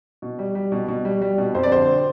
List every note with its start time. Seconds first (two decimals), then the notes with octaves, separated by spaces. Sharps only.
0.22 B2
0.39 G3
0.55 G3
0.72 B2
0.88 B2
1.05 G3
1.22 G3
1.38 B2
1.55 F2 C5
1.63 D5
1.71 D3 C5